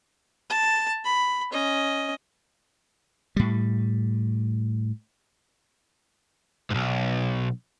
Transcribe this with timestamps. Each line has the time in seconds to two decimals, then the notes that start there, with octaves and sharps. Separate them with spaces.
0.50 A5
1.05 B5
1.52 C#4 D#5
3.36 A2 G3
6.70 B1 G#2